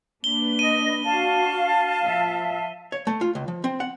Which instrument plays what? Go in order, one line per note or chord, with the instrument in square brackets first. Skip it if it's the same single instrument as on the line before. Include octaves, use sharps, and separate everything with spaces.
[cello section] A#3 D4 B4 [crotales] G7
[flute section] D#5 [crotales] D#7
[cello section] D4 F#4 [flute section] F5 A5
[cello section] F3 E5
[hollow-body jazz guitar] C#5
A3
F4
C#2
F3
C4
F#5